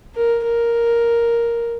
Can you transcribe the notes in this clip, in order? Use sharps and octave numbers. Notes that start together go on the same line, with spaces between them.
A#4
A#4